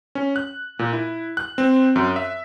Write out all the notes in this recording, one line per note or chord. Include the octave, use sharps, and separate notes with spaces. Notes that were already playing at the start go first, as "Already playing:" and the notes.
C#4
F#6
A#2
E4
F#6
C4
F#2
E5